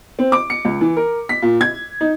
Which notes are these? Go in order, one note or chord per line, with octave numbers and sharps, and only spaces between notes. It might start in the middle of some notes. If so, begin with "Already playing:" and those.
C4
D6
C#7
C#2
E3
A#4
B6
A#2
G#6
D#4